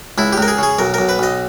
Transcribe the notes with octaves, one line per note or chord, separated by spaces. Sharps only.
C#2 E4
G4
C#2 A#4
G#4
C#3 G#4
B1 A#4
B1 A#4
B4
B1 D#5